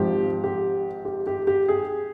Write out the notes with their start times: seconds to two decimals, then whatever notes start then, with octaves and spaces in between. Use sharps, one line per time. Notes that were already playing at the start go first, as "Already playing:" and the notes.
Already playing: G#1 G#2 F3 G4
0.44 G4
1.05 G4
1.27 G4
1.47 G4
1.68 G#4